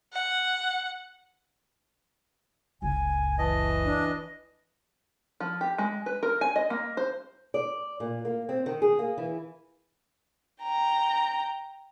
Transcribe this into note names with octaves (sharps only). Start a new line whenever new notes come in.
F#5
F#1 C#2 G#5
E3 D#5 A5
D4
F3
G4
G#3
B4
A#4
G#5
D#5
A#3
C5
D5
A#2
A#3
C4
D#3
G#4
A#3
E3
G5 A#5